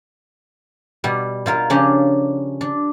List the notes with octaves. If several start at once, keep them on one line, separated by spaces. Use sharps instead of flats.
B2 G3
B2 F4 A#4
C#3 F3 C#4 D4 G4
D4